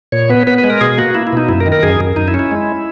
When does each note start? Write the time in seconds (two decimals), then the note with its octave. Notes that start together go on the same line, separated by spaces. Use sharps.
0.12 A#2 C#5
0.30 B3 B4
0.47 B3 B4
0.58 B4
0.64 G#3
0.70 A#4
0.81 B2 G#4
0.98 A#3 F#4
1.14 A#3 E4
1.27 E4
1.33 B2 D#4
1.49 F#2 E4
1.60 A#4
1.66 D#3
1.72 A#4
1.83 F#2 G#4
2.00 F#2
2.16 F#2 D#4
2.28 E4
2.34 C#4
2.39 E4
2.51 G#3